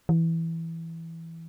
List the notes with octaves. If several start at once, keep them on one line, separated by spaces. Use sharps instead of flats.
E3